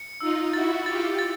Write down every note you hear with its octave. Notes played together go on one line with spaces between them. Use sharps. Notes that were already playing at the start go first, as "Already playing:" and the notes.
Already playing: C#7
D#4 F4 E6
E4 F#4 A6
F4 G4 A6
A6